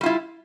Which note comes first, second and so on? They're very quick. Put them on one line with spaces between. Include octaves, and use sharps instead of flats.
G3 F4 E4